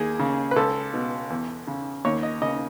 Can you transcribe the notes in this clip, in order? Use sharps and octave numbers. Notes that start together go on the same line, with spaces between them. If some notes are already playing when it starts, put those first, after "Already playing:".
Already playing: D#2 G#4
C#3
B4
C#2 A4
B2
E2
C#3
D#2 C#5
D#5
C#3 D#5